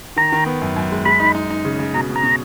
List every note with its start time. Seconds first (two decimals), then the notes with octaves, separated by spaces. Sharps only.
0.16 D#3 A#5
0.32 D#3
0.46 B3
0.62 F#2
0.76 F#2
0.91 G#3
1.05 G#3 B5
1.20 D#4
1.35 D#4
1.51 D#4
1.65 C#3
1.79 C#3
1.94 B2 A#5
2.10 B2
2.16 A#5
2.23 B2